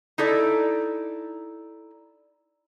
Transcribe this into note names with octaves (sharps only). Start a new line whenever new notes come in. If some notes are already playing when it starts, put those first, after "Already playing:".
D#4 E4 A4 D5